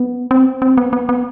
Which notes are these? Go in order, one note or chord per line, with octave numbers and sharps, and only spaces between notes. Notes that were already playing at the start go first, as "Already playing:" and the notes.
Already playing: B3
C4
C4
B3
B3
B3